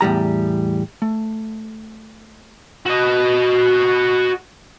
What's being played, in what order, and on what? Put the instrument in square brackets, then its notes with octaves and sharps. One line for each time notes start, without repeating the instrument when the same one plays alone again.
[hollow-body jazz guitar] E2 A2 G3 A#5
A3
[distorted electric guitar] F#4 D#5